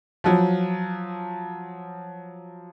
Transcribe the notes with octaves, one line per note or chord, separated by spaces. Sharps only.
F3 F#3